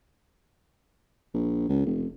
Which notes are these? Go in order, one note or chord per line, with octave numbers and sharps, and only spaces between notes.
A#1
C#2
F1